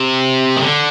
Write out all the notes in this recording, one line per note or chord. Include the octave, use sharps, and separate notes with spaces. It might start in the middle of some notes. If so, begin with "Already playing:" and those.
Already playing: C3
D#3
D3